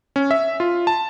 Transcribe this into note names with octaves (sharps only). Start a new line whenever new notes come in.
C#4
E5
F4
A5